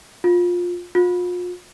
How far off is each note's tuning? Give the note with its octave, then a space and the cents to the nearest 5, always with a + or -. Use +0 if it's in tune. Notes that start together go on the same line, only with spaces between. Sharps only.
F4 +15
F4 +35